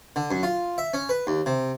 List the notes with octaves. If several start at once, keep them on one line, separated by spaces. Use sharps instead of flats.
D3
F#2
F4
E5
C#4
B4
D#2
C3